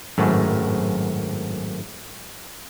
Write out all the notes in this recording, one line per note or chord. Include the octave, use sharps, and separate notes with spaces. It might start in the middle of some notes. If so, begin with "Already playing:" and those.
G#1 F#2 A2